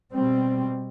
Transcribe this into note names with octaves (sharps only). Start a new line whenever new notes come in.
B2 G3 C4